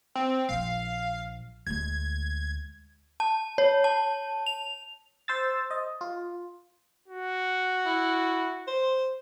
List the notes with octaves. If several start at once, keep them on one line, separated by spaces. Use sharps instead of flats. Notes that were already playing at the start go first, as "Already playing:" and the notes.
C4
A#1 F3 F5
D2 G#3 G#6
A5
C#5
A5
F7
C5 E6 A6
D#5
F4
F#4
E4
C5